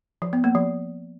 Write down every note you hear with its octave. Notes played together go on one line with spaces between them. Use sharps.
F3
B3
A#3
F3